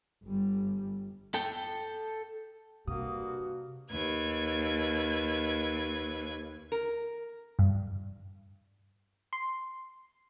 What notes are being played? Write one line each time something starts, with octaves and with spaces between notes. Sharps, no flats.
G1 G3
A4 G5
G2 C3 A#3 F#4 D#6
D#2 B4 G#6
A#4
G2
C6